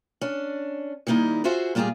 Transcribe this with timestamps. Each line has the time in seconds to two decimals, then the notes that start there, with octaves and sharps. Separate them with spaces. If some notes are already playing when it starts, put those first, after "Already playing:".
0.21 C#4 D4
1.07 D#3 G3 A#3 D#4 E4
1.44 F4 F#4 G#4 C5 E5 F#5
1.75 A#2 G3 A#3 F4 G4 G#4